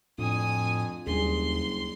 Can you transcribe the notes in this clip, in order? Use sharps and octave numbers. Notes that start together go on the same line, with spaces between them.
F2 A2 D4 G#5 D#6
F#1 D#2 G3 D4 G#4 C6